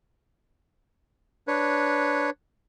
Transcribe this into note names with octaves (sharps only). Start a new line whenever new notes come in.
D4 B4 C#5